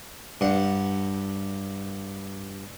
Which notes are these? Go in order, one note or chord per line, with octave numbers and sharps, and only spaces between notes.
G2 F#5